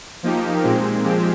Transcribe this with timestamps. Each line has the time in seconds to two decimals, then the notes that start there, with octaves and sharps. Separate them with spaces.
0.23 F3 A#3 D#4 G4
0.63 A#2 G#3 C4
1.04 F3 G#3 C4 G4